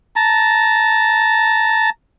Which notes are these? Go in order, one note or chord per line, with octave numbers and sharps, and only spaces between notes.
A5 A#5